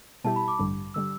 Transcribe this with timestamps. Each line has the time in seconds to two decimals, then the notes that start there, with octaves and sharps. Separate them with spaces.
0.24 B2 G3 E4 G4 A5
0.36 B5
0.48 D6
0.59 A1 G2 D3 G3
0.94 D3 G3 E6